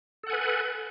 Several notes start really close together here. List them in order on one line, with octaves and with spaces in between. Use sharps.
A4 F#5 G#5 B4